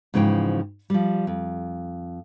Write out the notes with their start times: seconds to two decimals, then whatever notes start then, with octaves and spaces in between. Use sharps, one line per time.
0.14 G#2 C#3 E3 F3 G5
0.90 F3 G3
1.27 F2